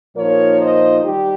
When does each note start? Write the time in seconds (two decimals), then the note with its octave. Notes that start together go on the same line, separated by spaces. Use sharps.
0.16 A#2 F3 A#3 D#4 A#4 C#5
0.60 C5 D#5
1.04 D#3 G3 D#4 G4